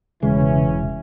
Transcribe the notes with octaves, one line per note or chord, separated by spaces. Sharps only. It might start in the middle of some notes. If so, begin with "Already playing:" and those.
E1 C#3 E3 G#3 C#4